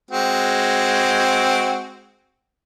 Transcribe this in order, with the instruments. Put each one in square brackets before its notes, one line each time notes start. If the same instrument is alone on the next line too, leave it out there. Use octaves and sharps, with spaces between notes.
[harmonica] G#3 C4 F#4